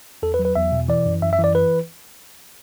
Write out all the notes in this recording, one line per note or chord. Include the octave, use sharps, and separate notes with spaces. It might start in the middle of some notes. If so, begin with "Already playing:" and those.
E2 A4
B4
F#3
B4
E2 E5
B2
E3 D5
F#2
F#2 E5
E5
E3
D5
B4